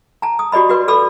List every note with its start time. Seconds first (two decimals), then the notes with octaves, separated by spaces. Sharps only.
0.22 A5 A#5
0.39 D#6
0.52 F#4 G4 D5 D#5 B5
0.70 F#4 B4 D5 C6
0.88 A4 D5 B5 D6 E6